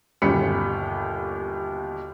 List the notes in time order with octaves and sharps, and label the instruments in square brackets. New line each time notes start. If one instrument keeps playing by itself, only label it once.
[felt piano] G1 D#2 B2 C#4 B5 C#7